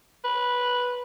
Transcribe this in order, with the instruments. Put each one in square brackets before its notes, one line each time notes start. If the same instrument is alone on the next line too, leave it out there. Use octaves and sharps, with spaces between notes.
[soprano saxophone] B4